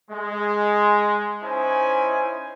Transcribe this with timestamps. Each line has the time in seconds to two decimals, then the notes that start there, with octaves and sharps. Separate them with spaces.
0.11 G#3
1.42 C#4 D#4 E4 C5 G#5